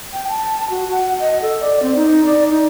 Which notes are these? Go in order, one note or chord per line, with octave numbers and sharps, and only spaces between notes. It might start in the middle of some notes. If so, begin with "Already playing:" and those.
G5
A5
F#4
F#5
D#5
A4
D5
C4
D#4
D5
D#4